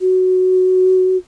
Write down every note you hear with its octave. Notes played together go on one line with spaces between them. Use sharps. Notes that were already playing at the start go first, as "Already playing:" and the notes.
F#4